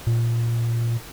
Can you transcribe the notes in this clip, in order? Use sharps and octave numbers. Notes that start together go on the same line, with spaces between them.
A#2